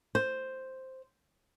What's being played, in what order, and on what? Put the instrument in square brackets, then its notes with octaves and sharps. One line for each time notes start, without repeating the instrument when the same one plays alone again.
[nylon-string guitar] C5